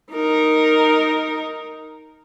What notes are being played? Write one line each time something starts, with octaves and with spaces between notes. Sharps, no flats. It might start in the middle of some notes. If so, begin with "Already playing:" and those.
D#4 A#4